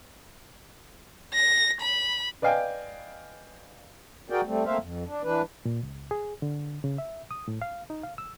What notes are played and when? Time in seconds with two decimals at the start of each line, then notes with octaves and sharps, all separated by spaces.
1.34 A#6
1.81 B5
2.42 B4 D5 D#5 F5 G5 G#5
4.30 F#4 G#4 A#4 D5 G5
4.45 G3 A3 C4
4.65 A3 A#3 C4 C5 E5 F5
4.79 F2
5.06 D4
5.24 E3 D4 B4
5.65 A#2
5.83 C#2
6.11 G#4
6.42 D3
6.84 C#3
6.98 E5
7.31 D#6
7.48 A2
7.62 F5
7.90 D#4
8.03 F5
8.18 E6